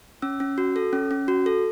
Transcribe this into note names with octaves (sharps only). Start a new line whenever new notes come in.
C#4 E6
C#4
F#4
A4
C#4
C#4
F#4
A4